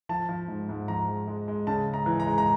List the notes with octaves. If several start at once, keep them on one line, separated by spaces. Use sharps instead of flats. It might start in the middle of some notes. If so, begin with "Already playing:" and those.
F3 A5
F3
G#2
G#2
F3 A#5
G#3
G#3
G#3
C#3 A5
G#3
A#5
E3
A#5
G#3
A#5